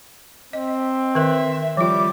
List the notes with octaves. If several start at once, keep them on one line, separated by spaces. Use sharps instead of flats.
C4 D#5
D#3 A#4 E5
F3 G3 F4 D6